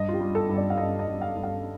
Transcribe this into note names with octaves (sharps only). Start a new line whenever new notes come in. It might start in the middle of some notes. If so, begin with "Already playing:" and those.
Already playing: G2 D#5
F4
G4
G3
A4
G2
D5
F5
G2 D#5
D#5
G2
F5
G2
F5